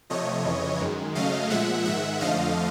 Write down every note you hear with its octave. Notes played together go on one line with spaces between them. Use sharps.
C3 F3 A3 C#5 D#5
F2 C#3 E3
F#2 D#3 G#3
F#2 C#3 F#3 A3 D#5 F5
A#2 F3 G#3 E5 F#5
G#2 D#3 G#3 E5 F#5
F2 D3 F3 A3 D#5 F5